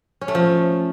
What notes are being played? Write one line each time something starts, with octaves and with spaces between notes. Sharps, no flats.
C#4
A3
F3